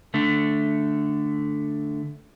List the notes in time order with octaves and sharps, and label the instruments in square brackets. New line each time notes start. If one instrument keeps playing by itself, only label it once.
[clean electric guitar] D3 A3